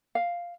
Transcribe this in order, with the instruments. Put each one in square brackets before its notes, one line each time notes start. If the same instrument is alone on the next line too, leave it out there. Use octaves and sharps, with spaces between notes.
[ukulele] F5